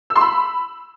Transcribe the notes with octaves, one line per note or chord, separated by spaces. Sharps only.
E6
C6
B5